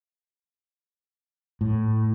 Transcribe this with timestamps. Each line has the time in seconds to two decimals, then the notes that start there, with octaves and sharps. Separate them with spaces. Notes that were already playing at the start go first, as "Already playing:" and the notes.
1.61 A2